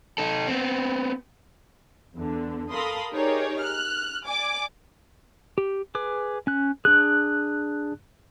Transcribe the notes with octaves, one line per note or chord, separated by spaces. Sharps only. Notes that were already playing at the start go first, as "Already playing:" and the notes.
D#4 A4
B3 C4
E2 D3
A4 A#4 F5 B5 C6 D#6
D#4 G4 G#4 A#4 C#5 D5
F6 F#6
D5 G#5 D6
G4
G#4 B4 D6
C#4 F#6
D4 G#4 F#6